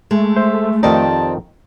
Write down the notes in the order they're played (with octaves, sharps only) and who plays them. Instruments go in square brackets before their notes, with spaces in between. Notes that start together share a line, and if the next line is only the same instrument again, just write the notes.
[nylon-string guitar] G#3 [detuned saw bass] A3
[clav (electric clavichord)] C5 [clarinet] E5
[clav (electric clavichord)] F2 D#3 D#4 [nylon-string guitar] C4 G4 D5 [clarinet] A5